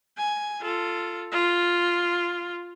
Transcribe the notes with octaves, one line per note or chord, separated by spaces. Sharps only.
G#5
F4 A4
F4